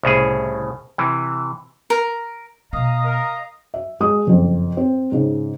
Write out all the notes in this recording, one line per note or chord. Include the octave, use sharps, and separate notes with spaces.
C2 A2 C#3 G#4
C3 E3
A#4
B2 B3 D#5 F5 A#5 D#6
A#4
E5
G#3 D#6
F#1 F2
C4
G#2 C#3